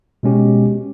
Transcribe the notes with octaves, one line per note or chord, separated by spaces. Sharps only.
B2 G#3 C#4 G4